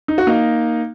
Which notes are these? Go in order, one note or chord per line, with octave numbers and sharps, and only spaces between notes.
D#4
F#4
A#3 D#4